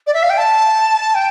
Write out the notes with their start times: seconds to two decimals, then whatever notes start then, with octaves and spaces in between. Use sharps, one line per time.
0.07 D5
0.14 E5
0.23 F5
0.30 G5
0.38 A5
1.15 G5